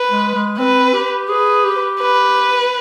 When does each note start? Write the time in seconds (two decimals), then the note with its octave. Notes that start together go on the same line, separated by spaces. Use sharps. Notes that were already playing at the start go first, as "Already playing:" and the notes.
Already playing: B4
0.11 G#3
0.35 G#3
0.58 C4 B4
0.94 G4
1.29 G#4 B4
1.65 G4
2.01 B4